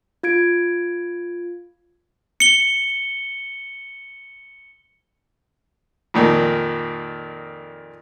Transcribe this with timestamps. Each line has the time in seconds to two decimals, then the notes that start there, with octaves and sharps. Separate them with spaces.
0.23 F4 G#6 D7
2.40 C#7 G7
6.14 F2 A#2 D#3